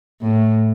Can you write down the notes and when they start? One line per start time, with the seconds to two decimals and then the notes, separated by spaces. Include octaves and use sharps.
0.21 A2